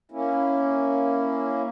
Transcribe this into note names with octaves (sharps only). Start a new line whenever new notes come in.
A#3 C#4 E4